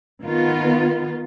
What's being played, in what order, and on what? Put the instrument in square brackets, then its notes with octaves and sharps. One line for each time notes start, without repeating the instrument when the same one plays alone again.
[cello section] D#3 B3 F4